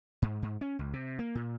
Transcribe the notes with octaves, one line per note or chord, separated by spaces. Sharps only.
G#2
G#2
C#4
C#2
C3
A#3
A#2